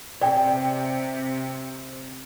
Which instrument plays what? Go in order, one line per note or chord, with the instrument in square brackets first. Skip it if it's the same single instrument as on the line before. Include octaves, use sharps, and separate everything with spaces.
[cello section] C3 [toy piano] D5 G5